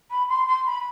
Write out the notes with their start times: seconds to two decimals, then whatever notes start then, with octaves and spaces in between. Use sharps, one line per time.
0.11 B5
0.29 C6
0.47 C6
0.66 B5